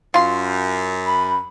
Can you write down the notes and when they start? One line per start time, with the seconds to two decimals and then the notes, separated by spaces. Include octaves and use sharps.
0.14 F#2 F4 C6
1.06 B5